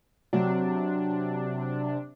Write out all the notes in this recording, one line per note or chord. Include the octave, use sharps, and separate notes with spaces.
C3 F#3 D4